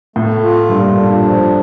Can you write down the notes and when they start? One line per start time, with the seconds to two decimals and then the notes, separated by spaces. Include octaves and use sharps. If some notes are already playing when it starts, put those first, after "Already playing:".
0.16 A2 A3
0.43 F4
0.69 G2 A#2
0.97 D4
1.23 F3